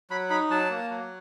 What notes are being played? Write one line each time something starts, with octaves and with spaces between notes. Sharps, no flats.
F#3 B5
D#4 B5
F#3 A5
A#3
F#3